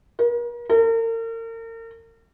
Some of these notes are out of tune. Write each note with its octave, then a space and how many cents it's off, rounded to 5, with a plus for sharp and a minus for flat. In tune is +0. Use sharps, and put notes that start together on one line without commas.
A#4 +40
A#4 -40